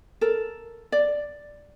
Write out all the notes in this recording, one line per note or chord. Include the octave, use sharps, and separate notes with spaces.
A4 A#4
D5